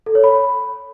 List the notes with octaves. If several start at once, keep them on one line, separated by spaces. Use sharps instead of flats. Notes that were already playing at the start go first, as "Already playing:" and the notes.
A4
C#5
B5